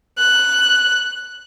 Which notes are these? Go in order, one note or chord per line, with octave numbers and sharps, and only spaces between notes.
F#6